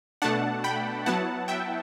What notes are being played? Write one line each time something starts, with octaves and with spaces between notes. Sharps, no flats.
B2 A3 D4 F#5 A5
G5 B5
F#3 B3 E4 F#5 A5
E5 G5